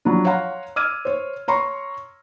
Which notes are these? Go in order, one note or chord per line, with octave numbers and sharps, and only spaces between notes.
F3 F#3 D4
C#5 F5 F#5 A#5 C6
D6 E6 F6 G#6 D#7
C5 C#5
C#5 A#5 C6 C#6